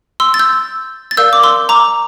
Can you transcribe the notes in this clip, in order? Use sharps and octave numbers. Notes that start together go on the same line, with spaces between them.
C6 E6
A6
E6 G6
A6
A#4 D5 F5 E6 G6
D6
C6 E6
A#5 D6